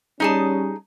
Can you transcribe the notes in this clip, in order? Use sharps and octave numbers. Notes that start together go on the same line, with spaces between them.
G3 C#4 D#4 G#4 A5